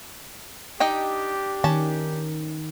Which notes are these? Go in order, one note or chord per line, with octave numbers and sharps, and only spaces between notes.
D4 D#4 G4 D#5 G5
D#3 C#4 A5